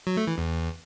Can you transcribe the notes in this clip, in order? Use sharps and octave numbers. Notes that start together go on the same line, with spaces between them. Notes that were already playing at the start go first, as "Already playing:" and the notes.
F#3
A3
E3
E2